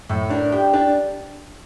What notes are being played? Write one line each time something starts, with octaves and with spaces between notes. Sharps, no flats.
A2 A4
D4 A#4
G4 G5
D4 A5